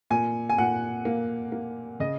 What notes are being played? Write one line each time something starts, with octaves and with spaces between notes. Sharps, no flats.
A#2 G#5
G#5
A#2 F#5
A#3
A#3
C#3 D#5